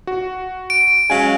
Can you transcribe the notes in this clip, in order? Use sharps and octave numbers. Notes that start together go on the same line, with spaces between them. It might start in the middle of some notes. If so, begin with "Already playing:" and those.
F#4
D7
F#3 G#3 C#4 F5 G#5